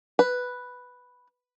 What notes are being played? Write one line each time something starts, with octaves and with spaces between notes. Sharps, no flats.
B4